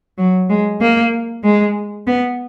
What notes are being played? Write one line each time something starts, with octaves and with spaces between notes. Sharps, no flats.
F#3
G#3
A#3
G#3
B3